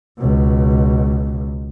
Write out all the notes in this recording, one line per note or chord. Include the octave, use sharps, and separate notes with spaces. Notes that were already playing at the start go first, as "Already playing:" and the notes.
C#2 B2